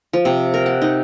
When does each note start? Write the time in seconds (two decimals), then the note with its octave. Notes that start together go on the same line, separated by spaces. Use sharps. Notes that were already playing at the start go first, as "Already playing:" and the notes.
0.13 F3
0.25 C3
0.54 A#4
0.66 F#5
0.82 D#4